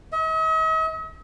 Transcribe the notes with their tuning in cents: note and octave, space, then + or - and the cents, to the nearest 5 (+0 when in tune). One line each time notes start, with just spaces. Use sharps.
D#5 +45